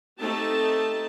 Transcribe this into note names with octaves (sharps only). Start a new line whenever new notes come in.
A3 C4 D#4 G4 A5